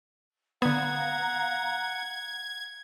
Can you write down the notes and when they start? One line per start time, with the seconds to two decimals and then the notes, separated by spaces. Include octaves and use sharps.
0.62 D3 B3 F5 F#5 A#5 G#6